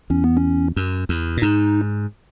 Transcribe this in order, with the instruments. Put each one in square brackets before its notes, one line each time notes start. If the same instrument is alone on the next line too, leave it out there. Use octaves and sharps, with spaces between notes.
[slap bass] E2 [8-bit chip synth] C#4
[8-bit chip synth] B3
C#4
[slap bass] F#2
E2
A#2
[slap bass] G#2 [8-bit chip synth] D#4